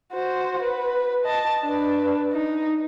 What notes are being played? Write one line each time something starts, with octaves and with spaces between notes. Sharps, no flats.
F#4 C5
B4
D#5 A5
D4 B4
D#4